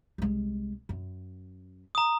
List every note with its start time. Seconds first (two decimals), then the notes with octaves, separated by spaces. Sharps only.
0.18 C2 G#3
0.89 F#2
1.95 A#5 D#6